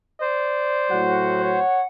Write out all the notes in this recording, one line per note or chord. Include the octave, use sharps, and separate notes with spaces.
C5 D5
A2 F#3 F#4 F#5
C#5